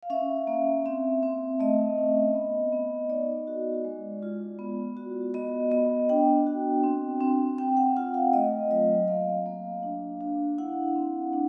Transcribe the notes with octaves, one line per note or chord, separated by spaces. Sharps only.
F5
C#4 E5
A#3
C4
C4
A3 D#5
C#4
B3
B3
D#4 D5
F#4
G#3
F4
B3
F#4
B3 D#5
B3 D#5
D4 G5
F#4
C4
C4
C4 G5
F#5
F4 F#5
F5
A3 D#5
F#3 D#5
A#3 F5
A#3
D4
D4
E4 F#5
C4
D4